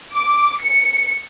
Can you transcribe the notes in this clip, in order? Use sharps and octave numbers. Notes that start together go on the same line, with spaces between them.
D6
C#7